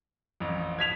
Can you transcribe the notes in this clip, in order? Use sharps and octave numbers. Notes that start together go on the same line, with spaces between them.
A1 F2
G#6 B6 F7